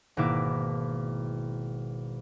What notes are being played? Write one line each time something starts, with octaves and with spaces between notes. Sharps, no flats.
G#1 B2 A#3 E4 D6